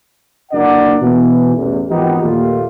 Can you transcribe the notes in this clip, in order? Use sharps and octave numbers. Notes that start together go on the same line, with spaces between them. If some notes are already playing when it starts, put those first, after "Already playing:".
F#1 A#3 D4 A#4 D5 F#5
B2 E3
A1 E2
G#1 E3 F3 B3 D#4 G4
D#2 A#2 D#3 G3 A3 F4